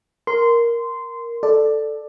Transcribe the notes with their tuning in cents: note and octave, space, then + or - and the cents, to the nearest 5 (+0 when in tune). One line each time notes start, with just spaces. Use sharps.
A#4 +5 C6 -15
A4 +0 D5 +10